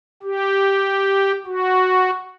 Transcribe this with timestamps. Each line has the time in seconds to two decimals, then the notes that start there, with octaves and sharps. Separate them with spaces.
0.23 G4
1.47 F#4